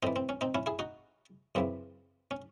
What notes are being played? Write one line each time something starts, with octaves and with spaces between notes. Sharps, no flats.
A2 E3 C4 D#4
C4
C#4
C4 D#4
C#4 E4
E4 G#4
D#4 F#4
F#2 C#3 E3 C4
C#4